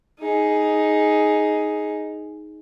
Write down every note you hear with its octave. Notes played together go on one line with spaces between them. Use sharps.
D#4 G#4